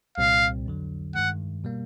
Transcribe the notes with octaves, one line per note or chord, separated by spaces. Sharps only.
C2 A#2 G3 C4 F5
F2 D3 F#3
G2 D#3 G#3 F#5
B2 G3 A#3